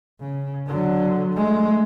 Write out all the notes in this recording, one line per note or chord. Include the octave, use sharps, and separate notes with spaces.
C#3
D3 F#3
G#3 A3